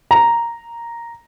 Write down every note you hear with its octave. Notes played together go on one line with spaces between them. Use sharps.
A#5